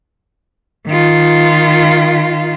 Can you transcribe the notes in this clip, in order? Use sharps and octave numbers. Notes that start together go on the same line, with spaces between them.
D#3 F4